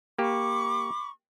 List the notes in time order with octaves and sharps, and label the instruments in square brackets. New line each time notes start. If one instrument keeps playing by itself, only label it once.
[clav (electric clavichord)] A#3 G4 [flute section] B5 C#6 D6